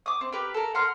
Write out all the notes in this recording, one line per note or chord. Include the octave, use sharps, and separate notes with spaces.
D6 D#6
C4
G4 A#4 B4
A4 A#4
F#5 A#5 C6 F6